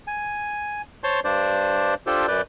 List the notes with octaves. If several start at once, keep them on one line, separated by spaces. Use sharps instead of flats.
G#5
C5 C#5 A5 C6
G2 D4 C5 D5
D4 F4 G4 A4 C5
F#2 B4 D5 G6